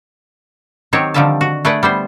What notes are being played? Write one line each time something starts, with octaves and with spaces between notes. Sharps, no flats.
D#3 F#3 C4 G4 C#5
D3 D#3 F3 G3 E5 A5
F#4
A3 D4 G#4 B4 D5 F#5
G3 B3 C5